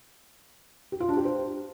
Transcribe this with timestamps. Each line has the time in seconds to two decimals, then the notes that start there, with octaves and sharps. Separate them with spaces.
0.92 G4
1.00 F4
1.09 D4
1.17 G4
1.25 C5